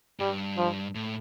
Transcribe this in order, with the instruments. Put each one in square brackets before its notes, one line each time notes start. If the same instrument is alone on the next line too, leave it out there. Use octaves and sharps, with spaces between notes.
[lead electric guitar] G2 [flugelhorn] G3
[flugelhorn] F3
[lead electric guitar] A2